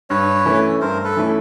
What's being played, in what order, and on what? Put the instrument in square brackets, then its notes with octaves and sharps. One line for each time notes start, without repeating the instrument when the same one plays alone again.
[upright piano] G2 [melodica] B4 C#5
[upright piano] E3 A3 C#4 E4
[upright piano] G2 [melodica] A#4 C5
[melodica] A4 B4
[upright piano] E3 A3 C#4 E4